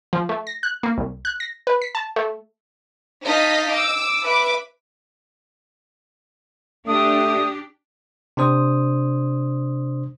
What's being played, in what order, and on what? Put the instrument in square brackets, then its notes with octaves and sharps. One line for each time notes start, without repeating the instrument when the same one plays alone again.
[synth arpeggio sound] F3
A3
A#6
F#6
A#3
C2
F#6
A#6
B4
B6
A5
A3
[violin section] D#4 D#5 F5 A5 B6
D6 E6
B4 E5 D6
[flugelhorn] A3 [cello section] D4 G4 [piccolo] D#6
[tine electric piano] C3 D4 C5 D#6